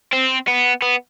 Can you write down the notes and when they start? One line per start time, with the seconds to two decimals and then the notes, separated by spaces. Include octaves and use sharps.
0.13 C4
0.48 B3
0.82 B3